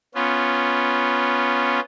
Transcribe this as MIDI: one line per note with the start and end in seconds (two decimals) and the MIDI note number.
0.15 1.80 59
0.15 1.80 61
0.15 1.80 65